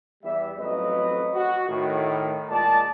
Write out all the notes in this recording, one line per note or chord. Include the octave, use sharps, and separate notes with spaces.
E2 G3 E5
A1 F2 F#3 B4 D#5
F#4
A2 D#3
A#2 G#3 D5 A5